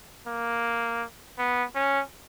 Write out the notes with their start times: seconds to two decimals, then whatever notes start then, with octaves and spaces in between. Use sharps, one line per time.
0.27 A#3
1.38 B3
1.75 C#4